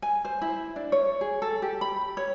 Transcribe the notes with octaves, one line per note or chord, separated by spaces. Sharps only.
G#5
C5
E4
D4
C#5
G#4
A4
G4
B5
C#5